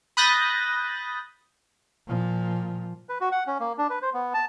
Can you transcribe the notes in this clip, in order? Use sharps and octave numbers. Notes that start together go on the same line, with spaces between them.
B5 D#6 F#6 G6 A6 A#6
A#2 F3
B4
F#4
F#5
C#4
A#3
D4
B4
C5
B3
A5